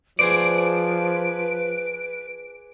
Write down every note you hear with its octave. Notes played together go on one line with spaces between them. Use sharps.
F3 G#4 B4 C5 D5 D7